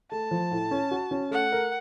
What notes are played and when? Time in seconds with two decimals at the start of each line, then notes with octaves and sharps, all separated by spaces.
0.11 A3 A5
0.31 F3
0.51 A2
0.71 C#4
0.91 F#4
1.11 C#4
1.31 A3 F#5
1.52 A#4